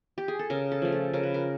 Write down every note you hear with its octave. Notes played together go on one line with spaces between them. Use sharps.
G4
G#4
A4
C#3 A#4
A4
F3 A3
A4
C#3 A#4
B4
A#4